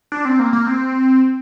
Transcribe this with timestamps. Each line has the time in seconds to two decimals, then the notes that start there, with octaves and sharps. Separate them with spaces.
0.12 D4
0.25 C4
0.39 A#3
0.53 A#3
0.67 C4